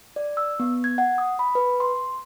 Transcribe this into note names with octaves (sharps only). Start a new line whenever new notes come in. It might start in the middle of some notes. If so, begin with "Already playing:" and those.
D5
E6
B3
G#6
F#5
D#6
B5
B4
C6